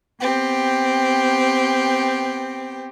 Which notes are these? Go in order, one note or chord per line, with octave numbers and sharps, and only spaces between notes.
B3 C4 G4